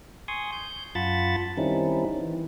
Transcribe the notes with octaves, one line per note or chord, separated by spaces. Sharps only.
G#5 C6 C#6 D#6
G6
F#2 F4 F#5 A5 B5 A6
D#3 G3 C4 C#4 D#4 E4
E3